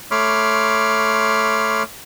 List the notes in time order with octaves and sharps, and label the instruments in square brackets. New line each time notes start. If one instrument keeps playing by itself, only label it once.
[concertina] A3 C#5 B5 C6 D6 F6